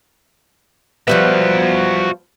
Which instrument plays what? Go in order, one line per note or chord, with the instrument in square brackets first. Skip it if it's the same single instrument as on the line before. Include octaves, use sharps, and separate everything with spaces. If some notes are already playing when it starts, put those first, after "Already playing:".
[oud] F3 G3 B3 [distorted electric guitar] F#4 E5